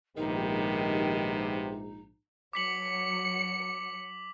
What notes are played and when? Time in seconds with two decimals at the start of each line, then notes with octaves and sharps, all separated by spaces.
0.17 A#1 G#2 C3 D#3 B3 D#4 G4
2.53 F#3 D6 B6 C#7 F#7